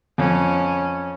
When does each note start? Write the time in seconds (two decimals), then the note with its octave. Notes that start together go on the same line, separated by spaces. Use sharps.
0.18 F2 C#4